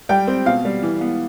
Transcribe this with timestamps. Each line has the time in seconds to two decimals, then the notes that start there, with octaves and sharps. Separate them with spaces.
0.09 G3 G5
0.27 C4
0.46 B2 F5
0.65 G3
0.83 E3
1.01 B3